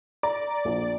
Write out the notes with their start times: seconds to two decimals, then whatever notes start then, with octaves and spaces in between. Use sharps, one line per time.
0.23 D5 A#5
0.65 A#1